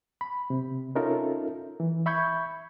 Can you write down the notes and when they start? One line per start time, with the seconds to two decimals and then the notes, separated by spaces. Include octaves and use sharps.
0.21 B5
0.50 C3
0.95 C#4 D#4 F4 A4 A#4 E5
1.80 E3
2.06 E5 B5 C#6 G6 G#6